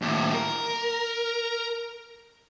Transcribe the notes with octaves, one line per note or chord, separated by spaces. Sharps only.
D#2 A2
A#4